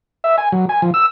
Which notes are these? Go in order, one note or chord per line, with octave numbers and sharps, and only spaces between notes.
E5
G#5
F#3
G#5
F3
E6